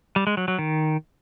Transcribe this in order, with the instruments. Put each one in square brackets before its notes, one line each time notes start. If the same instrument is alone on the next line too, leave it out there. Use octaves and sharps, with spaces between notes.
[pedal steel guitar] G3
G#3
F#3
F#3
D#3